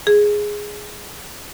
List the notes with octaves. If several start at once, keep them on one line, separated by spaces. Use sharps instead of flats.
G#4